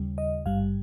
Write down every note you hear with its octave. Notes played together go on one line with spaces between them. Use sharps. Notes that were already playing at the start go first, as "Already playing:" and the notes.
Already playing: D#2 C#3 G3
D#5
G#1 G2 G3 F5